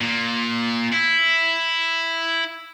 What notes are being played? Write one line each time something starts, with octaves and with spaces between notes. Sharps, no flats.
A#2
E4